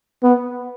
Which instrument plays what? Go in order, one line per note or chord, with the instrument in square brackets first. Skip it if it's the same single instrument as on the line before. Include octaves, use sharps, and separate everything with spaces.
[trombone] B3